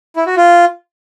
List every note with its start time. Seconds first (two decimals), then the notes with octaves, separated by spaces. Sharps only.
0.16 E4
0.26 F#4
0.37 F4